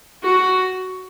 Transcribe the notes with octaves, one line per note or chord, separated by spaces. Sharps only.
F#4